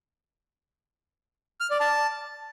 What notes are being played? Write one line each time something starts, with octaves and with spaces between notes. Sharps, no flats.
F6
D5
A5